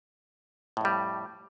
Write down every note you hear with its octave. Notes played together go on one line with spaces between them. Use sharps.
F2 A2 G3